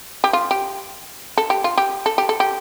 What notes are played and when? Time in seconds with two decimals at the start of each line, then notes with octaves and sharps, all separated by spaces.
0.24 G4
0.33 F4
0.51 G4
1.38 A4
1.50 G4
1.64 F4
1.78 G4
2.06 A4
2.18 G4
2.29 A4
2.40 G4